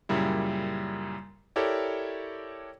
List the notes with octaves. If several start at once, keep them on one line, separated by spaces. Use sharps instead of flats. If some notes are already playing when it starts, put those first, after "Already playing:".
F#2 A#2 C#3 G3 E4
E4 G4 A4 A#4 C#5 D5